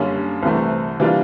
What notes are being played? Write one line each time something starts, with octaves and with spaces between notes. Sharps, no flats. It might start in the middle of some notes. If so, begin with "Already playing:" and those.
Already playing: F#2 D3 G3 A#3 C#4
C2 C3 E3 A3 C4
E3 G3 A#3 D4 F4